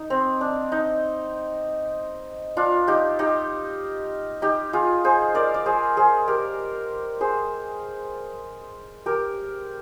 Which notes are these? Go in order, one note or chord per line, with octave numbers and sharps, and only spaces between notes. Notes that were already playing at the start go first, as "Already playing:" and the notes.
Already playing: D#4
C4
D4
D#4
D4 F4
D#4 G4
D#4 G4
D#4 G4
F4 G#4
G#4 C5
A#4 D5
D5
G#4 C5
G#4 C5
G4 A#4
G#4 C5
G4 A#4